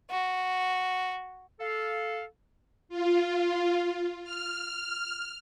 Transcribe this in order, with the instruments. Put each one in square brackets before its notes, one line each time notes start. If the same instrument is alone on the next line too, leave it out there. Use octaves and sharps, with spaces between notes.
[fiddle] F#4
[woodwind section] A4 F5
[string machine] F4
F6